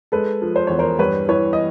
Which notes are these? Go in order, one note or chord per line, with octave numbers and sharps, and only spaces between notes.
G#3 A4 B4
F3
C5
E2 C#5
A#4 C5
G2 B4 C#5
E3 B4 C#5
D#5